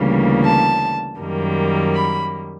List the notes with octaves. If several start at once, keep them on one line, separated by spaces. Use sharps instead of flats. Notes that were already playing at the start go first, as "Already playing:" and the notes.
Already playing: D2 C#3 E3 G3 A#3
A5
F#2 D#3 G3 A#3
B5